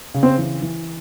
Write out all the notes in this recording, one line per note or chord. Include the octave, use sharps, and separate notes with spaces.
C#3
C4 C5
E3
E3